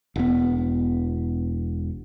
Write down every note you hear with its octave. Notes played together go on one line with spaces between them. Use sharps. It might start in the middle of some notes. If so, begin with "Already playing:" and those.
E1 B3